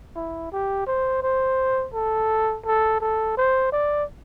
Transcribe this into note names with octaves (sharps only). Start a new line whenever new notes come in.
E4
G4
C5
C5
A4
A4
A4
C5
D5